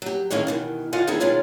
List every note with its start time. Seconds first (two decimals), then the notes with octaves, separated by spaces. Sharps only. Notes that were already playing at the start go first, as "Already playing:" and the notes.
0.02 F#3 G4
0.31 A2 D#3 E3 G#3 C#4 F5
0.47 B2 D#3 E3
0.93 D3 F4 D#5 F5 F#5 G#5
1.07 D#3 B3 C4 D#4 E4 G#4
1.20 B2 D#3 G#3 C#4 F4